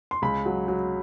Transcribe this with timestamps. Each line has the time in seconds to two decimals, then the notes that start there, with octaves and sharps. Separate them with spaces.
0.11 C6
0.22 C#2 B5
0.46 F#3
0.68 F#3